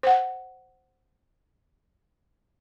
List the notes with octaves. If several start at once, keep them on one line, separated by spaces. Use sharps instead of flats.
C5 F#5